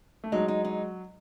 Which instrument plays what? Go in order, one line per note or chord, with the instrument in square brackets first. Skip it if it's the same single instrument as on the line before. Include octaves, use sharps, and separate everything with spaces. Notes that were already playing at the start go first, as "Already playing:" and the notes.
[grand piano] A3
[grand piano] F#3 G#3 [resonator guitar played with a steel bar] D#4
[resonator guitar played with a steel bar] D#4
D#4